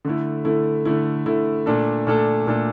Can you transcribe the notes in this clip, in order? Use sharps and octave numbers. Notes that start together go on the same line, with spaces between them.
D3 A3 E4
D3 A3 E4
D3 A3 E4
D3 A3 E4
A#2 A3 D4 A4
A#2 A3 D4 A4
A#2 A3 D4 A4